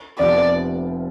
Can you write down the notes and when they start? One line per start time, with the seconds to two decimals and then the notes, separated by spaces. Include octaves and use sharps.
0.18 F1 F2 C3 F3 B3 D5